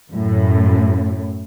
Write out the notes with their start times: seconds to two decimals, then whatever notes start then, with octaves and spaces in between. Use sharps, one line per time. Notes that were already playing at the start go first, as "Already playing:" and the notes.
0.11 F#2 A2